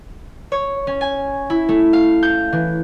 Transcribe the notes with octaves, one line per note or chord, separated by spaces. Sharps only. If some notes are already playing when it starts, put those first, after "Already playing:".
C#5
C#4
G#5
E4
A3
F5
G6
E3